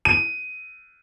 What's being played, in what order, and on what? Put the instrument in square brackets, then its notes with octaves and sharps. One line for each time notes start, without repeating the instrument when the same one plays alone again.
[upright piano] D#7